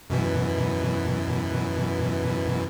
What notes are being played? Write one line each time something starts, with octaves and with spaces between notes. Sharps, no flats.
F#2 B2 E3